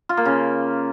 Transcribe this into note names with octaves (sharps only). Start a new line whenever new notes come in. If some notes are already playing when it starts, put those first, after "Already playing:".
F4
A#3
C#3